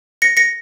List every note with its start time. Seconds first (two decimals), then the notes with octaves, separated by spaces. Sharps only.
0.22 A#6 C#7
0.37 A#6 C#7